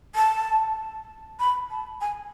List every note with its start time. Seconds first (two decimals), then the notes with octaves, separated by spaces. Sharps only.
0.15 A5
1.40 B5
1.70 A5
2.01 G#5